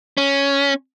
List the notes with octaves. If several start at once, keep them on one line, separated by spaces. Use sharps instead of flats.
C#4